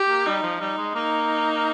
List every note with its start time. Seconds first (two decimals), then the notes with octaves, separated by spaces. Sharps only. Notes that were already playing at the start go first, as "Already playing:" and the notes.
Already playing: G4
0.09 A#3
0.26 G3 D#4
0.43 F3
0.60 G3 D#4
0.78 G#3
0.95 A#3 D#4